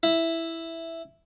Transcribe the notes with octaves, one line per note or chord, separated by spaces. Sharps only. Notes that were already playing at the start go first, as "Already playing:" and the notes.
E4